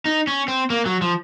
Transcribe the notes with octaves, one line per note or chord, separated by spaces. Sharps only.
D#4
C#4
C4
A#3
F#3
F3